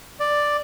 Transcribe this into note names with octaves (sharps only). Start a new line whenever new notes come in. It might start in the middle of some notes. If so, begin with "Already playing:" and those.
D5